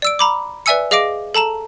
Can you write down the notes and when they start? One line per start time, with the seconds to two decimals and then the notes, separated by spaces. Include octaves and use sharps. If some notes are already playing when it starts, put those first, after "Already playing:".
0.02 D5 E6 D7
0.19 A#5 B5 D6
0.66 B4 D5 E5 G#5 E6 C#7
0.91 G#4 D#5 F5 D6 A#6 D7
1.35 A4 A5 A#5 E7